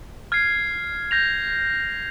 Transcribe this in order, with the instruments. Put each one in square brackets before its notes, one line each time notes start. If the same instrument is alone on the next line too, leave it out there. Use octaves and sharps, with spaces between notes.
[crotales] F6 G#6 C7
G6 A#6 F7